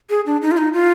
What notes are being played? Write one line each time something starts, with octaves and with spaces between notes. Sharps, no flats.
G#4
D4
D#4
F4
D#4
F4